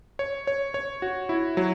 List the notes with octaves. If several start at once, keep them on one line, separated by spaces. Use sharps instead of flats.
C#5
C#5
C#5
F#4
E4
F#3